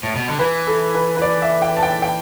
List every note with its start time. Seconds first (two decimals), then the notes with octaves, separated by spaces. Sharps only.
0.03 A2
0.16 B2
0.28 D3
0.39 E3 B4
0.67 A4
0.95 B4
1.17 B4
1.22 D5
1.42 E5
1.62 G5
1.77 A5
1.83 G5
2.02 G5